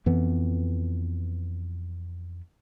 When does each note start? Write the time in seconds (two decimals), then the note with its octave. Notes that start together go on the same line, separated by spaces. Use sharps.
0.06 F2 E3 B3